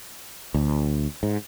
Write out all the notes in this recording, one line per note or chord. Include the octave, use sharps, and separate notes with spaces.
D2
G#2